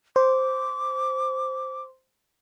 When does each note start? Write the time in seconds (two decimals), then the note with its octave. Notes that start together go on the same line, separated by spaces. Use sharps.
0.16 C5 D6